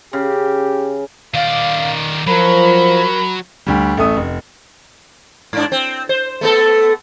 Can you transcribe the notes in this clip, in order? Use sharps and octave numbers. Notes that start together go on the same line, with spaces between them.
C#3 G4
D#3 D5 F5
F3 F#3 A#4 B5
D2 G3
A1 A3 D#6
F1
G#2 D4
C4
C5
A3 B3 A4